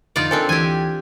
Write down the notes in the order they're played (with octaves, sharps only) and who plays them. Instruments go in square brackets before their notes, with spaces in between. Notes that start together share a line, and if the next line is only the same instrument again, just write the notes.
[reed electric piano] F2 D3 [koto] D#4 F4 D5
[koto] C4 D4 A4 [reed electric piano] A#4 C5 G#5
[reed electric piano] D2 E3 G#6 [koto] G4 G#5